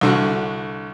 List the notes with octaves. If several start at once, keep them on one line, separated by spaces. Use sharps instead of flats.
C2 D3 F#4